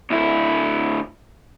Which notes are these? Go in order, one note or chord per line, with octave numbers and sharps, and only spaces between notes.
D2 E4